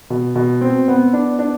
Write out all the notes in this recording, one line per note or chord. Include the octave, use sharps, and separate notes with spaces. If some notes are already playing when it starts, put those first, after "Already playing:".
B2
B2
C4
B3
D4
D4